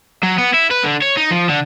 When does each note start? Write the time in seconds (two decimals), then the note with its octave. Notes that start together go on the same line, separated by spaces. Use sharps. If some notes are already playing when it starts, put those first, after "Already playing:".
0.23 F#3
0.38 B3
0.54 E4
0.71 B4
0.84 D3
1.02 C#5
1.17 D#4
1.31 F3
1.49 D3